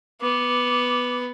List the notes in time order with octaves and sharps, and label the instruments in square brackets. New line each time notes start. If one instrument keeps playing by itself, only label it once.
[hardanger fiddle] B3 [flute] D6